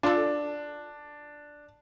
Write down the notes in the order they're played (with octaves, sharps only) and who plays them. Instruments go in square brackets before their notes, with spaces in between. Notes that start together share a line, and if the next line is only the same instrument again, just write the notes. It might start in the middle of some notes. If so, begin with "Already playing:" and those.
[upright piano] D4 [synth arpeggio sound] F4 A4